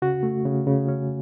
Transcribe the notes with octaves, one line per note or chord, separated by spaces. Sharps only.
C#3 F#4
A3
C#3
C#3
C#4